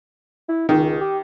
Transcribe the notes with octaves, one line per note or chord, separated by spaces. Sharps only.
E4
C#2 D#3
G4